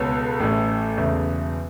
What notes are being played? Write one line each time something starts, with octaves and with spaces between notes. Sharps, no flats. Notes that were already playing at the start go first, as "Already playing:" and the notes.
Already playing: C#2 B2 B3 A4 C#5
A1 A2 A3 C#4 A4
E1 E2 C#3 A3